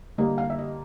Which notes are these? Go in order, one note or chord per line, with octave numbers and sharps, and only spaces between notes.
D3 G3 A#3 D#5
F5
E5
D#5